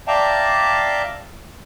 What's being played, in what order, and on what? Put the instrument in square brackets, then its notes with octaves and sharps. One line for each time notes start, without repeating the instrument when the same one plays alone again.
[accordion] D5 E5 F5 G5 A5 A#5